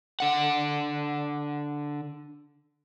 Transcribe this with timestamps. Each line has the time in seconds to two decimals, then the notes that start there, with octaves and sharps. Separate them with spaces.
0.20 D3 F#5